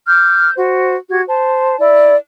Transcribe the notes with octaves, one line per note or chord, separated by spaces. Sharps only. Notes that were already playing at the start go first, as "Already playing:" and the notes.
D6 F6 G6
F#4 C5
F#4 G4 G#6
C5 A5
E4 D5